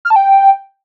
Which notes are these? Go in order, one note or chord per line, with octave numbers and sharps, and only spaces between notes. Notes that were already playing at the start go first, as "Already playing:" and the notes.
F6
A5
G5